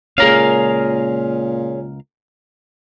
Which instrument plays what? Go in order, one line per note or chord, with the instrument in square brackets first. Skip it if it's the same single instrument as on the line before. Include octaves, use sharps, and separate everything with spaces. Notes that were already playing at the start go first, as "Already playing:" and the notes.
[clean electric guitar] C#2 A#4 F5 [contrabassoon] A#2 [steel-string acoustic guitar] C#4 G#4